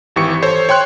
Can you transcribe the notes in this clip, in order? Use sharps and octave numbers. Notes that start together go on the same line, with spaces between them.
G#1 E3 G4 C#6 C#7
A4 C5 C#5
C#5 G5 C6 F#6 C#7